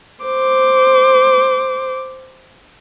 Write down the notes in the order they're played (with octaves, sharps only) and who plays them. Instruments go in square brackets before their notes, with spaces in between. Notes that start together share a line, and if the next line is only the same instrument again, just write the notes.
[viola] C5 D6